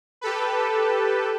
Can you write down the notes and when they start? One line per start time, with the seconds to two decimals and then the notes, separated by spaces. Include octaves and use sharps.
0.21 G4 A4 B4